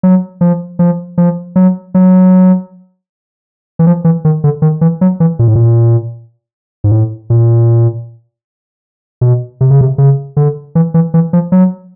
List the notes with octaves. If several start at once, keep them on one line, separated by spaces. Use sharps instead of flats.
F#3
F3
F3
F3
F#3
F#3
E3
F3
E3
D#3
D3
D#3
E3
F#3
E3
A#2
A2
A#2
G#2
A2
A#2
B2
C3
C#3
C3
C#3
D3
E3
E3
E3
F3
F#3